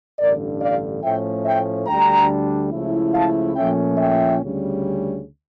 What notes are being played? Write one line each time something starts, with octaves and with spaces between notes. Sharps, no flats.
A1 G2 D3 A#4 D5
D5 F5
A2 F3 A3 C#4 E5 G5
E5 G5
D2 D3 G3 D4 G5 A#5
C#2 C#3 F3 A3 E4
F5 A5
A#2 F3 A3 C#4 E5 G5
E5 G5
D2 C#3 G3 C#4